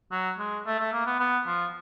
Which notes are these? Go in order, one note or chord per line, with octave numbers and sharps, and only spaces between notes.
F#3
G#3
A3
A3
A#3
B3
B3
F3